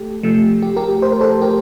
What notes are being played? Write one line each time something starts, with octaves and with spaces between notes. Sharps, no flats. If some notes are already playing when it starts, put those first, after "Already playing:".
Already playing: A3 G4 A4
C3 F3 A3
G4
G4 A#4
C5
A#4
A4 C5
G4 A#4